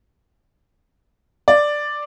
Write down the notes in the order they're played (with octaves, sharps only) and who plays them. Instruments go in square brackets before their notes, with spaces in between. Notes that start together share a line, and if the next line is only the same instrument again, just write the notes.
[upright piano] D5